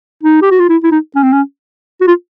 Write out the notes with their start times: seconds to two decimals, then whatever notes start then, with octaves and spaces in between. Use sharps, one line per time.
0.23 D#4
0.42 G4
0.51 F#4
0.59 F4
0.69 E4
0.83 E4
0.92 D#4
1.16 C#4
1.23 C4
1.33 C#4
2.01 F#4
2.07 F4